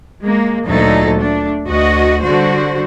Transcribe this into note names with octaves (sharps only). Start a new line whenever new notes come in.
G#3 A#3
D2 A#2 F#3 A3 D#4 A4
A3 D4
D2 F#4 D#5
D3 G3 F#4 C5